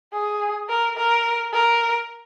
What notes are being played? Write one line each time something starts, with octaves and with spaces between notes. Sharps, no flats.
G#4
A#4
A#4
A#4